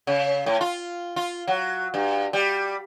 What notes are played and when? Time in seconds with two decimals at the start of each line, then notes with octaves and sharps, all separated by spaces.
0.07 C#3
0.46 A2
0.61 F4
1.16 F4
1.48 F#3
1.94 G2
2.33 G3